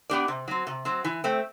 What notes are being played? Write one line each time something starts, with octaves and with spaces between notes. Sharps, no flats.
B3 D4 G4 D5
C3
F#3 C4
C3
F#3 C4
E3
A3 C4